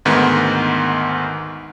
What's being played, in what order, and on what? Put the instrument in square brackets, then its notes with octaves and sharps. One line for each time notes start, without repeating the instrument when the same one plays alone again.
[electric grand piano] D2 G#2 D#3 B3